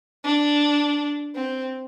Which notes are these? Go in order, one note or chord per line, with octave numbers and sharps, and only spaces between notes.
D4
C4